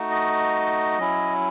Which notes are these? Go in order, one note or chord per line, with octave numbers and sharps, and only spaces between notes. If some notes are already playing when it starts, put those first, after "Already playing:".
Already playing: A3 D#4 F#4
D#5
F#3 C#4 E4